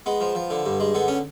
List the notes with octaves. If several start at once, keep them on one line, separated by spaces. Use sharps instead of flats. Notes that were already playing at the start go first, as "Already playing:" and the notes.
G#3 B3
F3
F3
D3
G2
G#3
D3 B3
C#4